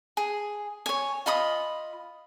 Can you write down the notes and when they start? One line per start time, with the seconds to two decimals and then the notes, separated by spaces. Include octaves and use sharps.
0.17 G#4
0.86 C#5 G#5
1.26 F4 D#5 B5 D#6